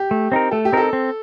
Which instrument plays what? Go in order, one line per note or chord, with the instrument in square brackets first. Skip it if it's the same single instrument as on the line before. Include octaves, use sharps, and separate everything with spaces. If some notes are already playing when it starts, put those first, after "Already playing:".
Already playing: [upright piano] G4
[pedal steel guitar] A3
C4 D#4 A#4
[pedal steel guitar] A3 [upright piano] A4
[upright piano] G4
[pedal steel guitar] C4 D#4 A#4 [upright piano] A4
[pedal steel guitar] C4